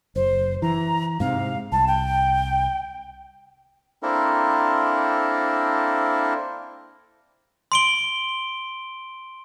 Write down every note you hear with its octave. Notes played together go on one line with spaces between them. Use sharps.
F#1 C5
E3 A#5
G#2 C3 F5
C2 A5
G5
A#3 C4 D4 E4 A4 A#4
C6 D7 G7